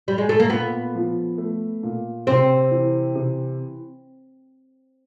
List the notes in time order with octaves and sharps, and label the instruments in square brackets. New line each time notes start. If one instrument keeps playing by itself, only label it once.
[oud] G3
G#3
A3
A#3
[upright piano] A#2 [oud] B3
[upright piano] F3
A3
A#2
[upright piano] C3 [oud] C4
[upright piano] E3
C3